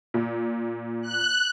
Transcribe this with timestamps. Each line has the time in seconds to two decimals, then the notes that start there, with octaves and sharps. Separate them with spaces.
0.14 A#2
1.02 F#6